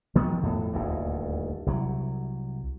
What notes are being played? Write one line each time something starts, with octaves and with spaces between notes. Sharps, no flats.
D#3 F3 B3
F2 A2
D#1 D2 G2
C2 F#3